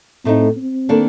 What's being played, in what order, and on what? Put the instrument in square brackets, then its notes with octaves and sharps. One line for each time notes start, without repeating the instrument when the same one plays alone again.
[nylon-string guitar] A2 A3 D#4 [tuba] C4
[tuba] C4
[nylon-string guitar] D#3 A#3 D4 A4